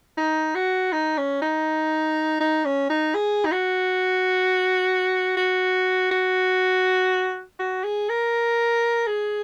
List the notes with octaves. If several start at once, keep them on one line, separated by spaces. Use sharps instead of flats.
D#4
F#4
D#4
C#4
D#4
D#4
C#4
D#4
G#4
D#4
F#4
F#4
F#4
F#4
G#4
A#4
G#4